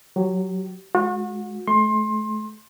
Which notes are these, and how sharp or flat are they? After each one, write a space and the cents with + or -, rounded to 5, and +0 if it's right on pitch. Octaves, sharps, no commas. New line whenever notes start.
F#3 +0 G4 -30
G#3 +20 F#4 -35
A3 -35 C6 +25